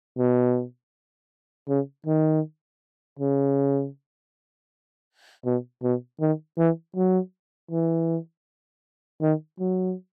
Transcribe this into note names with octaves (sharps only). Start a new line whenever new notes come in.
B2
C#3
D#3
C#3
B2
B2
D#3
E3
F#3
E3
D#3
F#3